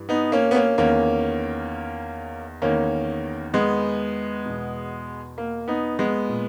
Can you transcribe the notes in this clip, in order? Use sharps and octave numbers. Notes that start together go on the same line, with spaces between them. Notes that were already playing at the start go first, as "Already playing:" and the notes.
Already playing: G2 E3
B3 D#4
A#3 C#4
B3
A#3 C#4
E2 D#3 A#3 C#4
E2 D#3 A#3 C#4
G#3 B3
E2 B2
A#3
B3 D#4
G#3 B3
A#2